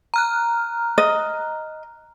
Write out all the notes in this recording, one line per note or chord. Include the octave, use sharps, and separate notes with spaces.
A#5 F6 F#6
D#5